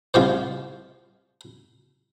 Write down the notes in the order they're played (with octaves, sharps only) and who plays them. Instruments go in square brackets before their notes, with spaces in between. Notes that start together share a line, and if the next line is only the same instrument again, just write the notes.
[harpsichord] C2 F4 G4 C5